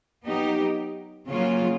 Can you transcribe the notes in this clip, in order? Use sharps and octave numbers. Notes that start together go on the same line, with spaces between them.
F#3 B3 D#4 G4
C#3 F#3 A#3 C#4 F4